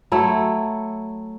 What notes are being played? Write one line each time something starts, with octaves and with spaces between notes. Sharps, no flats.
F#3 A3 E4